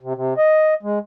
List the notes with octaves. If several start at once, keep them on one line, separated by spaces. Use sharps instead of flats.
C3
C3
D#5
G#3